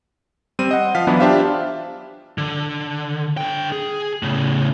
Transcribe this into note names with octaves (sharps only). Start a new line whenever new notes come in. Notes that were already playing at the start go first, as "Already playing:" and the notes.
G3 C4 D#7
D#5 F#5
F3 F5 B6
E3 F#3 B3 D4 E4
D4 F4 G4 C5 E5 F5
D3
D3 G5
G#4
A2 C#3